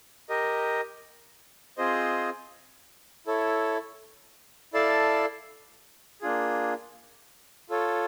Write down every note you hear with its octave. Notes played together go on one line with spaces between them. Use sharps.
G4 A#4 D#5
C4 F4 G#4 C5 D#5
E4 A4 C#5
E4 A4 D5 F5 A5
A#3 D4 F4 G#4
F4 A4 C#5